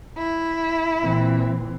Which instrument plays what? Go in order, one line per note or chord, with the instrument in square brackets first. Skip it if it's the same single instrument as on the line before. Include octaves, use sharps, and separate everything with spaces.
[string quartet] E4
[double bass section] A#2 E3 C4